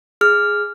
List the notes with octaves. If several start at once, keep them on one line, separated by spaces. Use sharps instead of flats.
G#4 F6